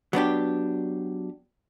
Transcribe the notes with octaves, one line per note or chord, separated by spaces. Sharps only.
F#3 B3 D4 G4